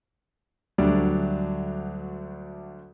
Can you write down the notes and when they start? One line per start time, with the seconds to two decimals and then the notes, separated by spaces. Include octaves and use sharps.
0.78 D2 F#3 G3 A3 D4 D5